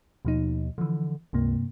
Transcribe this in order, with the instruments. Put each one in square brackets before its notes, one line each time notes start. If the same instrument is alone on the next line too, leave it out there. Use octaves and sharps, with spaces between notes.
[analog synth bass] D#2 [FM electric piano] B2 F3 D#4
[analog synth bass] D3 [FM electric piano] E3 F3
[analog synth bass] C#2 [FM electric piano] G2 C3 A#3